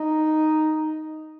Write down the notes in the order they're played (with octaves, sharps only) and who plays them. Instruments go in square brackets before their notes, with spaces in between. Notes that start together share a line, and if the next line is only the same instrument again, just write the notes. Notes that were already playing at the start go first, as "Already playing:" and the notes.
Already playing: [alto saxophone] D#4